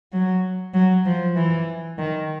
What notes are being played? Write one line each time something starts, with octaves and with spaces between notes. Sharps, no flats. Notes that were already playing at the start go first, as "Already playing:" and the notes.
F#3
F#3
F3
E3
D#3